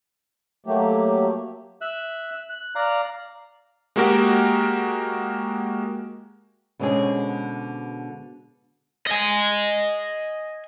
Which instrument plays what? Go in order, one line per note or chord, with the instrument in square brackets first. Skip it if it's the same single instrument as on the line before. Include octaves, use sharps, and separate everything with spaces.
[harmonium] F#3 A3 A#3 G4
[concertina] E5 F#6
F#6
D5 F5 A#5
[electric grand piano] G#3 A#3 F#4 G4 A#4 G5
[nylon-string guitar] B2 D3 G#3 C4 C#4 G#4
[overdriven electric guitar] D#5 G#5